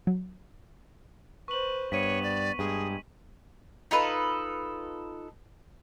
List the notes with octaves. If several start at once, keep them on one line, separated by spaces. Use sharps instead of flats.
F#3
B4 C5 C#6 F#7
G2 B3 C#5 B6 D#7
D5
G2 G#3 G#4
D#4 F4 A4 B4